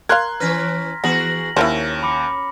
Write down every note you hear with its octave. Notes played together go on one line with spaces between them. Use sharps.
A#4 F5 A#5 C6 F#6 G#6
E3 C#4 B4 F6 A#6 B6
E3 B3 F#4 G#4 A#6 F#7
D#2 C#4 E4 A#4 C5
B5 D6 C#7